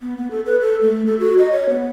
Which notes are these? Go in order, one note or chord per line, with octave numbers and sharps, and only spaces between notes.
B3
B3
A4
B4
A4
A3
A4
F#4
D#5
C#5
B3